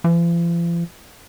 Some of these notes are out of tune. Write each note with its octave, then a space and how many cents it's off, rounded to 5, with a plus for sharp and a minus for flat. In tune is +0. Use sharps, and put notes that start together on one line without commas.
F3 -45